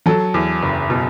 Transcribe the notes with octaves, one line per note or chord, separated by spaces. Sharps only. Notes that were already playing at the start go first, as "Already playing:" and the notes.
F#3 A4
E2
F#1
B2